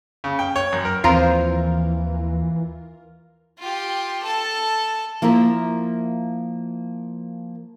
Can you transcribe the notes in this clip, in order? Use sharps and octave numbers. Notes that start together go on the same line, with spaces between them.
C#3
G5
C#5
F#2
A#4
D#2 E3 F3 C4 F4 A#4
F4 G4
A4 A5
F3 A#3 E4 A#4 E5